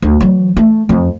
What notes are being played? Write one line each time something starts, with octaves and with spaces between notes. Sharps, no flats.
D2
E3 F#3
A3
F2